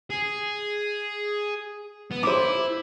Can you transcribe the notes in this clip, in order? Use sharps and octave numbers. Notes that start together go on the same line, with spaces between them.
G#4
B3
E4 C5 D6